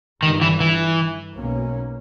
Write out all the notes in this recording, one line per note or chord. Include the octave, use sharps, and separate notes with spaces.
G1 G2 D#3 G3
E3
E3
B1 B2 A#3 C#4